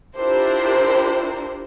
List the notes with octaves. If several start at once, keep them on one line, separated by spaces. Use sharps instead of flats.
D4 E4 F4 G4 A#4 C5